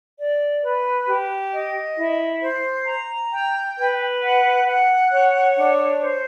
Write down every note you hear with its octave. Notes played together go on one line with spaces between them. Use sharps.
D5
B4
G4
D#5
E4
C5
A#5
G5
B4
F#5
F#5
C#5
D4
C5